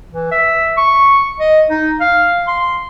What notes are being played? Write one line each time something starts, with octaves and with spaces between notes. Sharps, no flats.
E3
E5
C#6
D#5
D#4
F5
C6